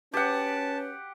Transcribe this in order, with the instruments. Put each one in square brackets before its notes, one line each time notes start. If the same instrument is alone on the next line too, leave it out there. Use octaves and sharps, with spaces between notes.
[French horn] C#4 [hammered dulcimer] G4 F#5 [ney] B4 [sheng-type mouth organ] A5